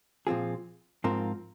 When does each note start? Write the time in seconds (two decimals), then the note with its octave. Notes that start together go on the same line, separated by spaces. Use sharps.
0.27 A#2 F3 C4 F4 G#4
1.04 G#2 F3 C4 F4 A#4